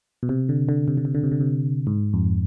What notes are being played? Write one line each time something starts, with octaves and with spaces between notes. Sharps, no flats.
B2
C3
D3
D3
C3
D3
C3
D3
C3
D3
C3
G#2
F2